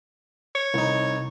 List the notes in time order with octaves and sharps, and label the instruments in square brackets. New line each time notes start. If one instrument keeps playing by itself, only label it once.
[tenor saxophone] C#5
[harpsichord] C2 D#4